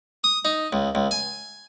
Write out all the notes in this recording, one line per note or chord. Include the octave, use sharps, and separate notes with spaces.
D#6
D#4
C#2
C#2
G#5